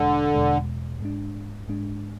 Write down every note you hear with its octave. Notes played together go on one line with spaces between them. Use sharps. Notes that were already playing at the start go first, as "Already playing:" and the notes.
Already playing: E2 B2 D3 G#3
E2 B2 G#3
G#2 G#3 D4
G#2 G#3 D4